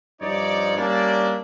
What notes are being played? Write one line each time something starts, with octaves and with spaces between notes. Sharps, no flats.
G2 F3 D#4 C#5 D5
G3 A#3 C#4 D4 E4 D5